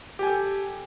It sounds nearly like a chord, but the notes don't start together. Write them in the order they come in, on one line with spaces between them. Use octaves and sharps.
G4 G#5 A4